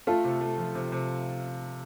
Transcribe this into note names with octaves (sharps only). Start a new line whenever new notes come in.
A3 F4 A4
C3
A3
F3
C3
C3